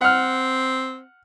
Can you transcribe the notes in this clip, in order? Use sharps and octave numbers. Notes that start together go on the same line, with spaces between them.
C4 F#5 F6